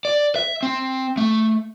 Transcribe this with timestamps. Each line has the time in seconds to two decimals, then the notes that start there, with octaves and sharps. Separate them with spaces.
0.05 D5
0.36 E5
0.63 C4
1.17 A3